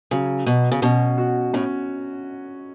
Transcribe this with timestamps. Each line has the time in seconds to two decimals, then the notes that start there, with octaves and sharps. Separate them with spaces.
0.11 C#3 F#3
0.46 B2 F#3
0.72 C#3
0.82 B2 C#4
1.18 F#4
1.54 A2 C#4